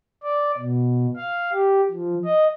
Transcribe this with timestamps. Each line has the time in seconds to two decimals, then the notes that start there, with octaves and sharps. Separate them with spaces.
0.23 D5
0.58 B2
1.17 F5
1.52 G4
1.91 F3
2.25 D#5